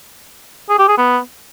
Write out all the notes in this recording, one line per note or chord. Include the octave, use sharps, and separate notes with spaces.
G#4
G4
G#4
B3